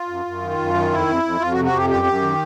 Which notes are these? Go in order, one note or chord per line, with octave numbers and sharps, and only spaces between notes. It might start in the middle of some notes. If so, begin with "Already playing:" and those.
Already playing: F4
F#2
F#2
D#3
F#2
D#3
F2 E4
F2
F2
F2 F4
F#4
C3
F#4
F2 G4
F#2 G4
F#2
D#3